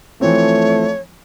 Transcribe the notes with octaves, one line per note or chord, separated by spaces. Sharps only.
E3 F3 A3 C4 C#5